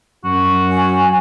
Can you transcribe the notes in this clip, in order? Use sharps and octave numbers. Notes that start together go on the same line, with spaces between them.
F#2 F#4
G#5